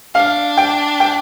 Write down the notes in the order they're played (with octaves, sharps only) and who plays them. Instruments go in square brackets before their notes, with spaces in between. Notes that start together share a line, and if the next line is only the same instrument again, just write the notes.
[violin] D4 [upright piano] F5
[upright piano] G5
G5